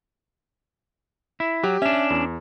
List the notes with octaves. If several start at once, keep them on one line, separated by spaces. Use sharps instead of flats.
E4
F#3 G4
C#4 D4 E5
E2